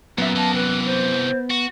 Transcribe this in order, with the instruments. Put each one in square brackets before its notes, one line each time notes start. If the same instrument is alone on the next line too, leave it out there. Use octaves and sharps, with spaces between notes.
[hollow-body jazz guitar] F#2 E5 [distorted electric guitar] A#2 [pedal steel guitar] B3
[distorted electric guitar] A#3 D#5 [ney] A5
[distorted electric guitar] C3 E3 [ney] B4
[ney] C5
[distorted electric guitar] F#4